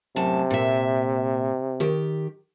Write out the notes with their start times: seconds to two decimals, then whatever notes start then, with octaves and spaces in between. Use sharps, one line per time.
0.16 F#2 A2 C3 A5
0.51 A#2 E5
1.80 D#3 G4